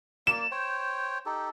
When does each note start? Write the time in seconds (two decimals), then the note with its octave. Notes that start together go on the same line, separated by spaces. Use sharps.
0.27 A#3 D5 E7
0.51 C5 C#5 G5
1.26 D#4 G4 A4